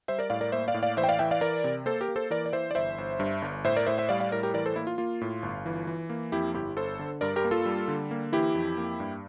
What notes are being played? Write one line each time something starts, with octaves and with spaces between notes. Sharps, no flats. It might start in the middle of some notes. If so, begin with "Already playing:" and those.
G3 C5 E5
A#4 D5
A2 D5 F5
A#4 D5
A#3 C5 E5
D5 F5
A2
D5 F5
E3 C5 E5
G5
D5 F5
E3 E5 G5
D5 F5
E3 A#4 D5
C3
A#3 A4 C5
G4 A#4
A#3
A4 C5
E3 A#4 D5
D5
E3 C5 E5
D5
G1 C5 E5
G1
G2
G1
A2 C5 E5
A#4 D5
A2 C5 E5
C5 E5
G3 D5 F5
D5 F5
A2 A#4 D5
G4 A#4
E3 A#4 D5
A4 C5
A#3 E4
F4
A#3 F4
A2
G1
E3
E3
A#3
F2 E4 G4
G1 E4 G4
G1 A4 C5
D3
G2 A#4 D5
G4 A#4
A#3
F4 A4
G3
D3
A#3
E3 E4 G4
F2
A#3
G2